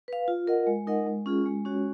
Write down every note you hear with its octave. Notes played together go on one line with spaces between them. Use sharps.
B4 F5
F4
A#4 D#5 F#5
G#3
D#4 A#4 D#5 F#5
G#3
C#4 F4 G#4
G#3
C#4 F#4 C#5